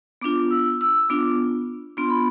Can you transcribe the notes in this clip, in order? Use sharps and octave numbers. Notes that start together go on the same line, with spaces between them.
B3 D4 F4 D6
E6
E6
B3 D4 F4 D6
B3 D4 F4 C6
B5